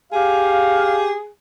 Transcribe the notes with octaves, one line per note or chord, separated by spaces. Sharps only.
G4 G#4 F5